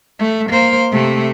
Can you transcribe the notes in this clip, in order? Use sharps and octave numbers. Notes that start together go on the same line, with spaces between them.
A3
A#3 C5
C3 A3